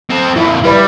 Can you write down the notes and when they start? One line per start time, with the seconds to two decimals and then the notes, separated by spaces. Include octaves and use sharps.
0.10 C4 A4
0.36 F2 A#2 E4
0.64 G3 E4 B4 D5